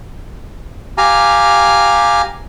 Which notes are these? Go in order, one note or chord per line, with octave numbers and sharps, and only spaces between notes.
G4 F5 G#5 A#5